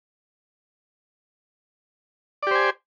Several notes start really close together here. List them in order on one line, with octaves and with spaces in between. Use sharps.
D5 G4 C5 G#5